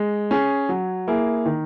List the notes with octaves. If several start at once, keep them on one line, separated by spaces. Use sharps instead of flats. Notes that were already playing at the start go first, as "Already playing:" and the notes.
Already playing: G#3
C#4 G#4
F#3
A#3 E4 G#4
D#3